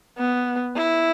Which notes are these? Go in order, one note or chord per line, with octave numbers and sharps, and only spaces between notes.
B3
E4